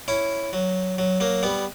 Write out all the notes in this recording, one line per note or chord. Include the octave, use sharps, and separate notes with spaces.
C#4 E4
F#3
F#3
F#3 A#3
G3 B3